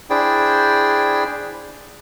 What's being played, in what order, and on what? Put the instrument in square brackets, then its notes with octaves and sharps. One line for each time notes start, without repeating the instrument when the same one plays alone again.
[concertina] D4 E4 G#4 C5 D5 G5